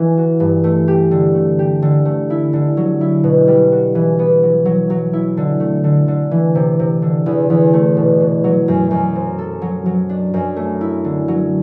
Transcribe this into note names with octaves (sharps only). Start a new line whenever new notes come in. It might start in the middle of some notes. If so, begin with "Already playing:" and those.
Already playing: E3
F#4
G2
A3
G4
D3
A3
G4
D3
A3
E4
D3
F#3
E4
B2
G3
F#4
E3
B3
F#3
F#3
F#3
E4
D3
A3
D3
D3
E3
C3
C3
D3
E2
E2
A3
B2
B2
F#3
F#2
F#2
C4
A4
F#3
F#3
D4
F#2
A3
E4
D3
F#3